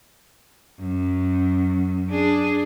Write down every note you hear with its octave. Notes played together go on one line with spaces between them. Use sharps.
F#2
D4 G#4